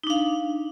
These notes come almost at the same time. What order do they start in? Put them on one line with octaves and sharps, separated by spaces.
D#4 D4 F5